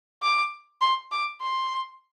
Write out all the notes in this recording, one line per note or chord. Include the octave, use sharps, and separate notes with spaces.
D6
C6
D6
C6